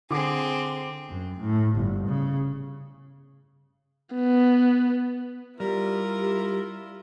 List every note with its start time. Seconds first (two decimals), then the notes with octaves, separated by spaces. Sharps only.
0.11 D3 C4 G#4 D6
1.09 F#2
1.41 A2
1.76 G1
2.07 C#3
4.15 B3
5.60 G3 E4 F4 G4 A#4